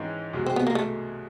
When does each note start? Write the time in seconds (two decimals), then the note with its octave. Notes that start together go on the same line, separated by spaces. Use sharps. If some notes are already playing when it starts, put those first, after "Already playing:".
Already playing: G#2 D#3 E3 G#3 C#4
0.34 C2 B2 G#3
0.46 C4
0.56 B3
0.67 A#3
0.75 A3